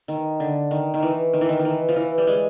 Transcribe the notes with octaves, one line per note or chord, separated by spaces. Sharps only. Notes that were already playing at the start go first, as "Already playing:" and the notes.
D#3
D3
D#3
D#3
E3
D#3
E3
D#3
D#3
E3
F3
E3
G3
G#3